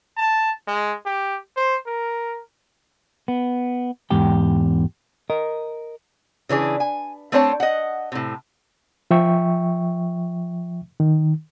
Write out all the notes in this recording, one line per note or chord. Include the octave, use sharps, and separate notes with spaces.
A5
G#3
G4
C5
A#4
B3
E2 G#2 G4 G5
A#4 D#5
C#3 E3 D4 G#4
G#5
A3 C4 D4 C5 C#5 A5
D#5 F#5
A2 C3
F3 E5 G5 C#6
D#3